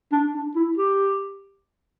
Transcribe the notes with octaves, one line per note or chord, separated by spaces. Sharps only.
D4
D4
E4
G4